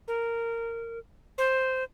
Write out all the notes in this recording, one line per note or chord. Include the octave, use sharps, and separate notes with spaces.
A#4
C5